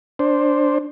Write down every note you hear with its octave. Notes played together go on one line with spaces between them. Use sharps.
D4 C5